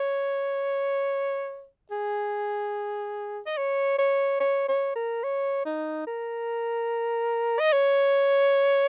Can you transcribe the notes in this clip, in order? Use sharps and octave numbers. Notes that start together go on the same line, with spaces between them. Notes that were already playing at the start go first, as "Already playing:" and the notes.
Already playing: C#5
G#4
D#5
C#5
C#5
C#5
C#5
A#4
C#5
D#4
A#4
D#5
C#5